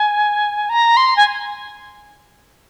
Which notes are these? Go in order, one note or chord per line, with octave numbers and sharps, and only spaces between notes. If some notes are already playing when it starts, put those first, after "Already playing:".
Already playing: G#5
A#5
C6
G#5